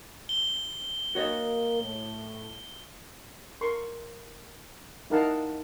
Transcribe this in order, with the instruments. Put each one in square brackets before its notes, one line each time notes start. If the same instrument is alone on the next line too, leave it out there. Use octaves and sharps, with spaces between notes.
[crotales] G7
[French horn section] A#3 A#4 [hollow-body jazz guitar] F#4 C#5 D#5
[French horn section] A2
[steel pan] A#4 C6 C#6
D#4 E4 A#4 F5 F#5 A5